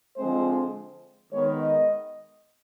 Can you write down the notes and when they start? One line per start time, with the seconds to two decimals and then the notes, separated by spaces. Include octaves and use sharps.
0.17 D3 F3 G#3 C4 C5
1.32 D#3 G#3 B3 C#5
1.61 D#5